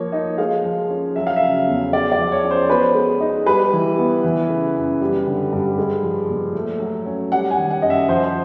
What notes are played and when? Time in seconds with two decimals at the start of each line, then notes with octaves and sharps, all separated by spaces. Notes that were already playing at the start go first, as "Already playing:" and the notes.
Already playing: F3 A#3 C#5
0.12 D#4
0.38 G#3 F5
0.65 F3
0.90 C#4
1.16 F#3 E5
1.27 F5
1.36 E5
1.42 C#3
1.67 E2
1.93 G#3 D5
2.12 D5
2.19 F3
2.32 C#5
2.43 C#4
2.51 C5
2.69 B3 B4
2.95 G#3
3.20 D#4
3.46 G3 B4
3.73 E3
3.98 B3
4.24 E3
4.50 C#3
4.76 F#2
5.01 G3
5.26 D3
5.53 G2
5.78 G#3
6.03 F3
6.29 A#2
6.55 A3
6.80 F#3
7.06 C#4
7.32 G3 F#5
7.50 G#5
7.58 D#3
7.70 F#5
7.82 F#2 D#5
7.90 E5
8.09 F3 C5